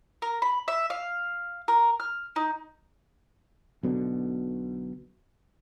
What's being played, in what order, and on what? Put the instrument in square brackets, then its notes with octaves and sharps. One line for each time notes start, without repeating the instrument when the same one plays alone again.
[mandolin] A#4
B5
E5
F5
A#4
F6
D#4
[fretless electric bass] B1 B2 D3